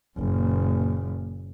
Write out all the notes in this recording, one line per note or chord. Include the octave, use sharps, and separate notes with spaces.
F#1 A#2